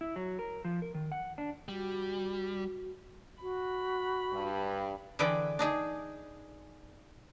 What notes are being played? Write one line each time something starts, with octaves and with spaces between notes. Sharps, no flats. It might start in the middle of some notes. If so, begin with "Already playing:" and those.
E4
F#3
A#4
F3
A#4
D#3
F#5
D4
G3 F#4
F#4 B5
G2
D3 E3 G#4 B4 D5 G5
D4 D#4 G#4